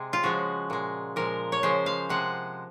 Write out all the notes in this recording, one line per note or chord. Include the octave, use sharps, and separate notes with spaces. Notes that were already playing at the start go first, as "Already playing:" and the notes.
Already playing: C3 G#3 G#4
F4
C#3 F3 G#3 F#4
A#2 G#3
A#2 F3 G#3 A#4
C#5
C#3 F3 G#3 C5
F5
C3 F3 G#3 F#5